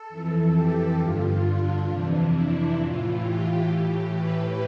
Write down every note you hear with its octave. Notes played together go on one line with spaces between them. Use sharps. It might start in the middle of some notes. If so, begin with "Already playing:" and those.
Already playing: A4
F2 E3
G4
G2 D3 F4
D4
F2 C3 E3
E4
A2 E3 F4
G4
A2 E3
B4